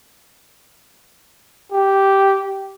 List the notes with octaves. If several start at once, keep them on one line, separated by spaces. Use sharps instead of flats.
G4